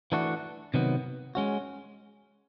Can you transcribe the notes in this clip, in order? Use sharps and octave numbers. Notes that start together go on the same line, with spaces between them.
E3 A3 D4 F#4
C3 D#3 F#3 B3
G#3 C#4 F#4